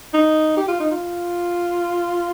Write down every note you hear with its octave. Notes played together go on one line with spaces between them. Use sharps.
D#4
G4
F4
D#4
F4